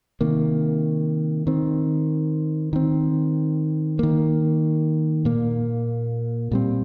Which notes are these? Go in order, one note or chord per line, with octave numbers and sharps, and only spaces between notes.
C3 D#3 A#3
D#3 C4
D#3 C4
D#3 A#3
A#2 A#3
A#2 G3 C4